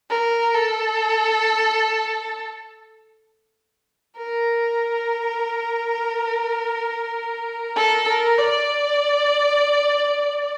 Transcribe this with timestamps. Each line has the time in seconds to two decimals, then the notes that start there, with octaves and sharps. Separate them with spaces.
0.10 A#4
0.55 A4
4.16 A#4
7.77 A4
8.07 A#4
8.38 D5